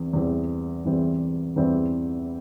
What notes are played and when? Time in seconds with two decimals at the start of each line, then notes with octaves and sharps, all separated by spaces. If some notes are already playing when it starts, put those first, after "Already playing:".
Already playing: E2 E3 C4
0.13 E2 E3 G3 C4
0.85 E2 E3 G3 C4
1.56 E2 E3 G3 C4